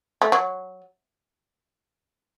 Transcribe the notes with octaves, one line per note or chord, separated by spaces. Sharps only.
A3
F#3